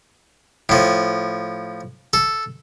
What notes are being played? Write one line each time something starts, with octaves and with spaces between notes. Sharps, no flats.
A2 F3
A4